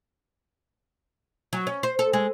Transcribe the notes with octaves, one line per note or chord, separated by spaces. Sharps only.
F#3
C#4
C5
A4
G#3